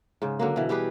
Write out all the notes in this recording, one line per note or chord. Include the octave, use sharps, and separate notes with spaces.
G#2 C#3
D3 F#3 A#3
B2 E3
G3 G4 G#4 B4